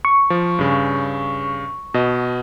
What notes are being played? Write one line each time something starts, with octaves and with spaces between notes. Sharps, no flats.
C#6
F3
G2 C#3
B2 D#5